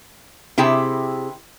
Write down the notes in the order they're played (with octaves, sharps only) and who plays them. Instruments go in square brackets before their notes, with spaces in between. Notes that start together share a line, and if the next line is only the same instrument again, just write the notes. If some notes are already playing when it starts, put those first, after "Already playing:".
[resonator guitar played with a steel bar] C3 E4 G#4 G5